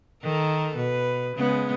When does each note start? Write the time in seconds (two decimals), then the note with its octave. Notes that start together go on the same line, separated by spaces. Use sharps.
0.23 D#3 A4 A#4
0.76 B2 B4
1.36 C#3 G#3 B3